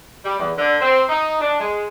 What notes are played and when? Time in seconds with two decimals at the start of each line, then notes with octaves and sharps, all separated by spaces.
0.25 G3
0.39 E2
0.58 D3
0.81 C4
1.09 D#4
1.40 D4
1.60 G#3